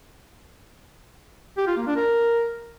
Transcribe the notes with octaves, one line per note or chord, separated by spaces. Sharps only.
G4
F4
A#3
D4
A#4